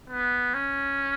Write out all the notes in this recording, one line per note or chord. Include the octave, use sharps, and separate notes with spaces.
B3
C#4